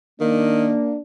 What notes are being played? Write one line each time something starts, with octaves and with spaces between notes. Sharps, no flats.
D#3 A#3 D4